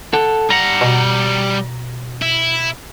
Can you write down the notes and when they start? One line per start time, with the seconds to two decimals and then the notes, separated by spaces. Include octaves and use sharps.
0.13 A4 F#5
0.50 G3 F#5 A#5
0.81 B2
2.22 E4